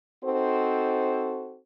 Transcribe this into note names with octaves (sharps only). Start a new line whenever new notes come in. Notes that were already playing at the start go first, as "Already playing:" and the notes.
C4 D#4 F#4 A4 C5